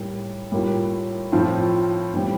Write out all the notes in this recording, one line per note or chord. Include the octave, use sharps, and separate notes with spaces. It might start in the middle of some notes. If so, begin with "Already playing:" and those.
Already playing: A2 G3 A#3
A2 G3 A#3 F4
A2 F3 C4 F4
A2 E3 G3 C4